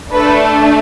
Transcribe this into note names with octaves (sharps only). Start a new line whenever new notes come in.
A3 D4 A4 B4